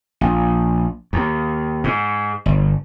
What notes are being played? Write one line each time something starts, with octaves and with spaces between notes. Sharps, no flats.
A#1
D#2
G#2
G1